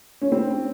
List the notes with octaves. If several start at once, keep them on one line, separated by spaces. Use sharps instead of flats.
C#4
C4